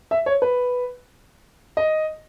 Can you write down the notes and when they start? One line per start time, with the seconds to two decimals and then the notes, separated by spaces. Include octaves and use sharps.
0.11 E5
0.26 C#5
0.42 B4
1.77 D#5